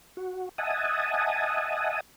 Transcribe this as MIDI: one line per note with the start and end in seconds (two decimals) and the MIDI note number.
0.17 0.49 66
0.58 2.00 75
0.58 2.00 76
0.58 2.00 78
0.58 2.00 80
0.58 2.00 81
0.58 2.00 87